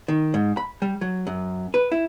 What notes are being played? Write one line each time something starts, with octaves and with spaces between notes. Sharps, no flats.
D#3
G#2
B5
G3
F#3
F#2
B4
E4